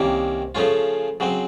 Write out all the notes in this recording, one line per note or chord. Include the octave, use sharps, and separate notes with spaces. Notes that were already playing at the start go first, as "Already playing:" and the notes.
Already playing: C2 C3 D#3 A#3 C#4
C#3 F3 A3 C#4 F4
C#3 F#3 C4